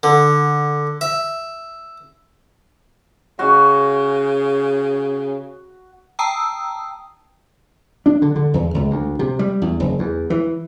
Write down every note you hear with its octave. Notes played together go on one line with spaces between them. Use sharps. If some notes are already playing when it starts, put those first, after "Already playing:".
D3
E5
C#3 F#4
G5 A5 A#5 D#6 E6
D4
D3
D3
E2
C#2
D2
C3
G3
E2
F#1
E2
E3